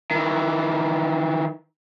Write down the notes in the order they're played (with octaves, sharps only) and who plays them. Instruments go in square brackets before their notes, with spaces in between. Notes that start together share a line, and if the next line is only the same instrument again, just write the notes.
[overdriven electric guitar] D#3 E3